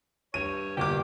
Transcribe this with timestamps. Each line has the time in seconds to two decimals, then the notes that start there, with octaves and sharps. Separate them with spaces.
0.34 G2 C#5 D#7
0.77 G1 A#3 G4 D6